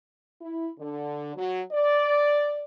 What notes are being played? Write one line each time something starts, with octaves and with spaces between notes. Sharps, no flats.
E4
D3
F#3
D5